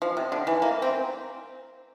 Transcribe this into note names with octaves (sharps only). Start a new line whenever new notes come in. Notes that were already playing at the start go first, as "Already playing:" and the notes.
F3
C3
D3
E3
A#3
C4